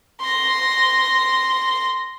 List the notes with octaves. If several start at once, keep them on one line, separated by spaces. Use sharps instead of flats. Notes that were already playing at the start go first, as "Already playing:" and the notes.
C6 A#6